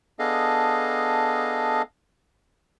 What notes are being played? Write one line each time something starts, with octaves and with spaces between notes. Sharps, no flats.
B3 D4 G#4 A4 D#5 F5